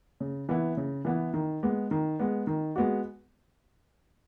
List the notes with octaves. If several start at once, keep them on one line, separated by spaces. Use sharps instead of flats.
C#3
E3 B3 E4
C#3
E3 B3 E4
D#3
G#3 B3
D#3
G#3 B3
D#3
G#3 B3 F#4